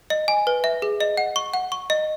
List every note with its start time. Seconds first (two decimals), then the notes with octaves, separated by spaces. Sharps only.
0.10 D#5
0.28 G#5
0.47 B4
0.64 E5
0.82 G#4
1.00 D#5
1.17 F#5
1.36 C#6
1.54 F#5
1.72 C#6
1.90 D#5